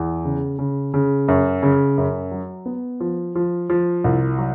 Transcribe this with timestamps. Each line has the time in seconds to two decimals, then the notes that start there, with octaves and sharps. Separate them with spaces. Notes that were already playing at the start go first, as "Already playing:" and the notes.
Already playing: E2
0.25 C#3
0.59 C#3
0.94 C#3
1.28 F#2
1.63 C#3
1.98 F#2
2.31 F#3
2.66 B3
3.00 F3
3.35 F3
3.69 F3
4.04 C2
4.38 F#3